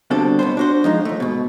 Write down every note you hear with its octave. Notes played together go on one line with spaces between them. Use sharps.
B2 D3 G3 C4 D4 A4
B1 B3 C5
D4 F#4 C5
F3 G#3 D#4
D#2 A3
G#2 B2